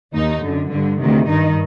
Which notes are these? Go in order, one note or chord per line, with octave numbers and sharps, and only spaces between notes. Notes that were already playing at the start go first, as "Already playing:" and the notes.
D#2 D#3 D#4
F#2 D3
G2 D3
D2 C3 D#3
G2 D#3 D#4